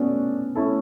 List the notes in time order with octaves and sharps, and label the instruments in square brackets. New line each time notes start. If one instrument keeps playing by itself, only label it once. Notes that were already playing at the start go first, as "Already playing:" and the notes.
Already playing: [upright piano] A3 D4 F#4 [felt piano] B3 C#4
[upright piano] A3 C#4 E4 A4